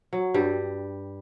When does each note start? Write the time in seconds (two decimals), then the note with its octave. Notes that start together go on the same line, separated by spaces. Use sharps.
0.13 F#3
0.34 G2 G3